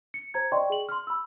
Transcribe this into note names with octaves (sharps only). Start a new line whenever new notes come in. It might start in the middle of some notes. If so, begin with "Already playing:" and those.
C#7
C5 A#5 G#6
D5 D#5 G5 C6 C#6
G#4 F#7
C6 F6
B5 E6